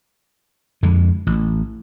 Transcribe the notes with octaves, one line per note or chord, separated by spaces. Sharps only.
F2 D3 G#3
A1